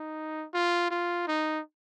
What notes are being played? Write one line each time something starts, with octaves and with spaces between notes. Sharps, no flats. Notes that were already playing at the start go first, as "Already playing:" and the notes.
Already playing: D#4
F4
F4
D#4